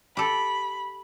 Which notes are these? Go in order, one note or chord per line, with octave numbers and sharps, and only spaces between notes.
G4 A4 B5